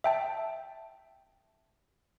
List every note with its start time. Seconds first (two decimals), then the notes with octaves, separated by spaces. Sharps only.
0.04 E5 G5 A5